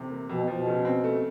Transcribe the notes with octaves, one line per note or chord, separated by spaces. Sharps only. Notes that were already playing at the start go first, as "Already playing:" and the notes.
Already playing: E2 C3 A3
A#3
F2 B2
F3
B2
C#3
C4
A3